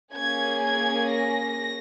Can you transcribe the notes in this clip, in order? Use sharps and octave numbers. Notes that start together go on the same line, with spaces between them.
A#3 C#4 G#4 G#6
G#6
A#6